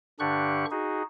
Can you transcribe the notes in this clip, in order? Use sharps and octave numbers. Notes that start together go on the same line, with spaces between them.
G2 D3 D4 G4 C#6 F#6
D#4 F#4 G#4